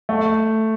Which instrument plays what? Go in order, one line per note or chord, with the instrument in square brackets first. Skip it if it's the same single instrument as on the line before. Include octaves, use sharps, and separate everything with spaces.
[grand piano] A3